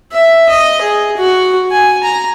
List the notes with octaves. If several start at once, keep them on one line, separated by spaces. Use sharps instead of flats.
E5
D#5
G#4
F#4
G#5
A#5